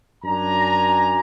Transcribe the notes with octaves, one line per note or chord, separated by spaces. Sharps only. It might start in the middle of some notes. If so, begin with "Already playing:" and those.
F#2 D4 G#5 A#5